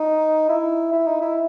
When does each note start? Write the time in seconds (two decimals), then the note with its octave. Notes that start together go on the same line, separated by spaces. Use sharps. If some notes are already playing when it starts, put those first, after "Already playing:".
Already playing: D#4
0.49 E4
0.93 E4
1.07 D#4
1.21 E4